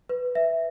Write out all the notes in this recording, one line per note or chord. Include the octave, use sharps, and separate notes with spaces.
B4
E5